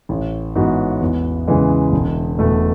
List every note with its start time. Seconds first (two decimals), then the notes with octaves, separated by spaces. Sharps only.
0.09 A1
0.55 G#2 E3 B3 F#4
1.01 E2
1.47 C#3 E3 G#3
1.92 E1
2.38 E2 B2 A3